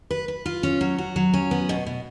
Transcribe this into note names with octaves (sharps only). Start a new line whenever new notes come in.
B4
B4
F4
C#4
F#3
F#4
F#3
C#4
B3
B2
B2